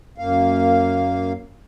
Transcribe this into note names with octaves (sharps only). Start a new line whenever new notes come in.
F#2 A#3 F5